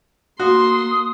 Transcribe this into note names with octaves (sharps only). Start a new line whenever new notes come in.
A#3 F#4 C6 D#6